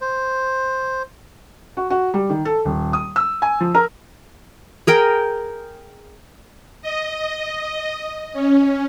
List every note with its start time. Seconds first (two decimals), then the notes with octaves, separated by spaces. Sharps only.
0.01 C5
1.77 F#4
1.90 F#4
2.14 G3
2.30 D#3
2.45 A4
2.65 D#1
2.93 D#6
3.16 E6
3.42 G#5
3.61 F3
3.75 A#4
4.87 G#4 A#4 G5
6.82 D#5
8.33 C#4